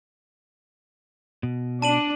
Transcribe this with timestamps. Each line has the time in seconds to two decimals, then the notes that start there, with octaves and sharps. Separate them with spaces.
1.43 B2
1.82 D4 A5 D#7 F#7